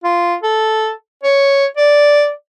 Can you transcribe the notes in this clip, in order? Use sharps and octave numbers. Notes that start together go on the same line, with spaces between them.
F4
A4
C#5
D5